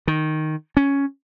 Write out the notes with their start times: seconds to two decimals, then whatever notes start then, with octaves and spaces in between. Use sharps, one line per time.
0.08 D#3
0.77 C#4